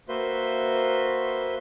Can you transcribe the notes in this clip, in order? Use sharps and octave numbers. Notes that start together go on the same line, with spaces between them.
A#3 F#4 B4 C5 E5 C6